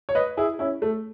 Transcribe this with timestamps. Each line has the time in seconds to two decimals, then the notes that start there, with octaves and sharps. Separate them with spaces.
0.09 C#5
0.15 B4 D#5
0.37 E4 G#4
0.59 C#4 E4
0.82 A3